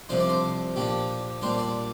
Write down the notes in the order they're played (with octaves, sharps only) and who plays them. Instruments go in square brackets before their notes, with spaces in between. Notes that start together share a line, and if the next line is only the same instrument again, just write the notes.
[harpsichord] C2 C3 F3 D4 C5
D5
C5
A#2 F3 D4 G4
A#2 G3 D4 C5
D5